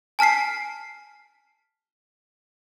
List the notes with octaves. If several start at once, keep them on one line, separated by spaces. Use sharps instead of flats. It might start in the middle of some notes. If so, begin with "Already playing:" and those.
G#5 A5 F6 B6 C7